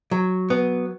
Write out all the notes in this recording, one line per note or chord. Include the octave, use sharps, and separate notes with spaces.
F#3
B3